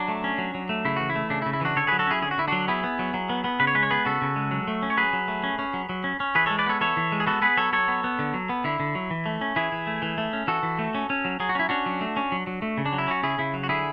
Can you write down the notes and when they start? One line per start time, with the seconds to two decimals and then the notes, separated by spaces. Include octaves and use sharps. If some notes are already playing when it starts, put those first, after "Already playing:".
Already playing: F#3 D4
0.08 A3
0.24 C#4
0.38 F#3
0.55 F#3
0.69 A3
0.85 C#3 E4
0.97 E3 F#4
1.10 E4
1.16 A3
1.30 C#3 D4
1.42 E4
1.46 C#3
1.53 E4
1.61 E3 D4 F#4
1.76 D3 A4 C#5
1.87 F#3 G#4 B4
1.99 F#4 A4
2.07 C#4 E4 G#4
2.22 D3 G#4
2.31 F#4
2.38 D3 E4
2.48 F#3 D4 F#4
2.68 B3 E4 G#4
2.84 B3
2.99 F#3
3.14 F#3
3.29 B3
3.44 B3
3.60 C#3 B4
3.67 C#5
3.75 G#3 B4
3.83 C#5
3.91 B3 G#4 B4
4.05 C#3 F#4 A4
4.22 C#3
4.36 G#3
4.51 F#3
4.68 A3
4.83 C#4
4.90 C#5
4.97 F#3 G#4 B4
5.13 F#3
5.28 A3
5.44 C#4
5.59 C#4
5.74 F#3
5.89 F#3
6.04 C#4
6.20 C#4
6.35 E3 G#4 B4
6.46 G#3 A4 C#5
6.59 B4 D5
6.66 B3 A4 C#5
6.81 E3 A4 C#5
6.97 E3
7.12 G#3
7.20 G#4
7.26 B3 F#4 A4
7.42 B3 G#4 B4
7.57 F#3 A4 C#5
7.73 F#3 A4 C#5
7.88 B3
8.04 B3
8.19 D3
8.34 F#3
8.49 B3
8.64 D3 E4
8.80 D3
8.95 F#3
9.11 E3
9.26 A3
9.41 C#4
9.56 E3 E4 G#4
9.72 E3
9.87 A3
10.02 E3
10.18 A3
10.33 C#4
10.47 E3 F#4 A4
10.63 E3
10.79 A3
10.95 C#4
11.10 C#4
11.25 F#3
11.40 F#3 G#4
11.49 F#4
11.55 C#4 E4
11.69 C#4 D4 F#4
11.86 F#3
12.01 A3
12.17 C#4
12.32 F#3
12.47 F#3
12.62 A3
12.78 C#3
12.86 D4
12.93 F#3
12.98 E4
13.08 C#4 F#4
13.23 C#3 E4 G#4
13.39 C#3 E4
13.54 F#3
13.63 F#4
13.69 D3 E4 G#4